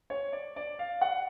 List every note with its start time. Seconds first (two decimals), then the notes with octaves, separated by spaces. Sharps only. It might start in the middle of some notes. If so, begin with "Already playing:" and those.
0.10 C#5
0.33 D5
0.56 D5
0.79 F5
1.01 F#5